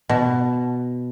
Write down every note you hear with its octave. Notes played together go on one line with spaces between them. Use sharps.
B2